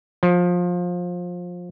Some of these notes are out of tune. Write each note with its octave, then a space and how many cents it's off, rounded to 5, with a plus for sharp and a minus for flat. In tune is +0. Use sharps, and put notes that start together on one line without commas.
F3 +20